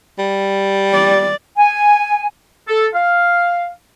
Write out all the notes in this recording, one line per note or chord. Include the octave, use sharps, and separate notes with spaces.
G3
D5
G#5
A4
F5